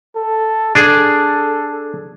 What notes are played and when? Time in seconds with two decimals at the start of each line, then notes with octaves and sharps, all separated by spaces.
0.16 A4
0.75 D4 G#4 A4